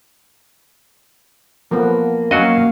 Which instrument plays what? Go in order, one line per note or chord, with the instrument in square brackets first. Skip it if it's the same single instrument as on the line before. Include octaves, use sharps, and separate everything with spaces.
[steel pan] F3 B3 [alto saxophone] A#3
[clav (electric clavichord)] F#3 F#4 D#5 [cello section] A#3 [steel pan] C#4 [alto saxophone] F5